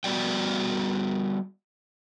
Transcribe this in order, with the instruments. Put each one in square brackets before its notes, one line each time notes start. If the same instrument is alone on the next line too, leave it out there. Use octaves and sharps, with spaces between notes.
[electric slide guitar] G3 B3 F#4 D5 G5